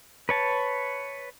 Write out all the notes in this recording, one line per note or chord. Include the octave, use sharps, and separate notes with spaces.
B4 C#5 A5